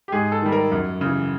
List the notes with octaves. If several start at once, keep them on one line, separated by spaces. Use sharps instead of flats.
G4
G#2 G#4
A4
D#3 G3
A#4
F#2
C#3 E3